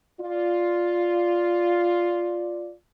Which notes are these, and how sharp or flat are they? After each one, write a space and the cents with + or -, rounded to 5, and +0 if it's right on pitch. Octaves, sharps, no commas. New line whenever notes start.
F4 +0 D5 +0